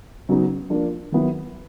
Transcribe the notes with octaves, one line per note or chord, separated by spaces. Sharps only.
C#3 F#3 B3 D#4
F3 A#3 D4 F4
D#3 F#3 B3 E4